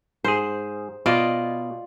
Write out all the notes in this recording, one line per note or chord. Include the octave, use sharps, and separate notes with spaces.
G#2 G#4 C5
B2 F4 D5 D#5